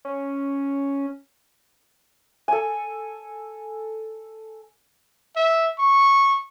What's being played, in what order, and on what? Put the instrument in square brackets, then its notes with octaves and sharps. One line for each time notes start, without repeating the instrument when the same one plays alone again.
[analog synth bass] C#4
[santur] A4 G#5
[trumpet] E5
C#6